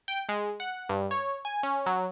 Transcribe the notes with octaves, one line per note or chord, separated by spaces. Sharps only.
G5
G#3
F#5
G2
C#5
G#5
C#4
F#3